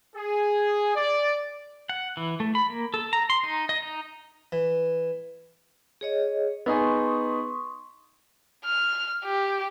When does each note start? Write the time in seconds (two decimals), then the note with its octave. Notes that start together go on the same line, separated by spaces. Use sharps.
0.16 G#4
0.96 D5
1.89 F#5
2.17 E3
2.40 A3
2.55 B5
2.70 A#3
2.94 A4
3.13 A#5
3.30 C6
3.44 D#4
3.69 D#5
3.82 D#4
4.52 E3
6.01 G#4 C#5 D#5
6.66 B3 D#4 G#4 C6 C#6 D#6
8.65 F6
9.25 G4